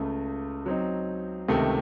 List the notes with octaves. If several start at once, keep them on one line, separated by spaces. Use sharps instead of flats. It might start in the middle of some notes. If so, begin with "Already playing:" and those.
Already playing: C#2 C#3 A3
F#3 C4 D#4
C#2 C3 D#3 A3